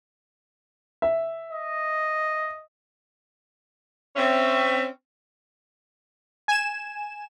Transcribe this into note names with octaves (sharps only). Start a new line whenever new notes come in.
E5
D#5
C4 C#4 E5
G#5 E7